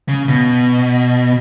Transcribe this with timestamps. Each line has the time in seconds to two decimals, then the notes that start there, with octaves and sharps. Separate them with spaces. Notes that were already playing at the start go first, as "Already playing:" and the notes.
0.08 C#3
0.28 B2